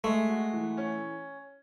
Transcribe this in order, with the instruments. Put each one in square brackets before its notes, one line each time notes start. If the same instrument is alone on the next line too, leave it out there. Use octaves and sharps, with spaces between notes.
[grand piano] G#3 [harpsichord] A3
[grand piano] F#4
E3
C#4